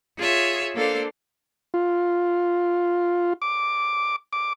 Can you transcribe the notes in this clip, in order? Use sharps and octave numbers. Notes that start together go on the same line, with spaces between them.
F4 G#4 C#5 E5
A#3 D4 A4 C5 F5
F4
D6
D6